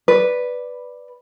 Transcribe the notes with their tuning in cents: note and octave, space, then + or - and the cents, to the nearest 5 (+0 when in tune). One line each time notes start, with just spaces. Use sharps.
B4 +0 D5 +0